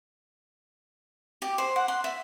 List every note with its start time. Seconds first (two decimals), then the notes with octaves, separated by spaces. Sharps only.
1.42 G4
1.58 C5
1.76 F#5
1.88 C6
2.04 E5